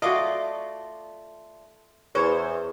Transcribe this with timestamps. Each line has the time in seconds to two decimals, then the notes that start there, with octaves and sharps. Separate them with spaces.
0.02 A3 F4 F#4 D5 D#5
2.15 E2 C5 C#5